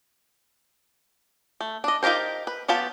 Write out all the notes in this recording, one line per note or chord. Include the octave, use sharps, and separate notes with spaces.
A3
D4 D#5
D#4 F4 G4 A#4 C5
B4
F#3 B3 F4 G4 A5